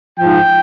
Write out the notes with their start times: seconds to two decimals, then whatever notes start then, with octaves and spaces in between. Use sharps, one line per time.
0.19 G#2 F3 G5